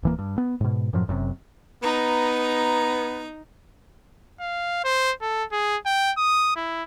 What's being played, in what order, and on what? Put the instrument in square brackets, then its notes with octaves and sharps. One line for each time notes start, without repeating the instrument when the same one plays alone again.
[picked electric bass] D1 E3 A#3
G2
B3
G#2 B2
F#2 A2 F3 F#3
F#1 F#2 A2 C3
[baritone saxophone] B3 [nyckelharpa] D#4 A#5
[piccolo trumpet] F5
C5
A4
G#4
G5
D#6
E4